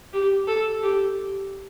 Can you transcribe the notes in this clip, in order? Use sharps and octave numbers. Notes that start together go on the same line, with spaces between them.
G4
A4
G4